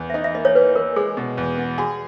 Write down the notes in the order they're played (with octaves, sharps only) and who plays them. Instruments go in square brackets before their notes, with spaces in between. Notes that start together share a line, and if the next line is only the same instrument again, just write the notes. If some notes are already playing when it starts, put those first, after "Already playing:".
Already playing: [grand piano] E2
[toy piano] E5
[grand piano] D#4 [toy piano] D#5
[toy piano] E5
[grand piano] A#3 [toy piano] D#5
[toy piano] C#5
[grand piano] E3 [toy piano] B4
[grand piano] E3 [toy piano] A#4
[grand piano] G#3 [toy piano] G#4
[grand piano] B2
E2
B3
[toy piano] F#4 [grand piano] G#4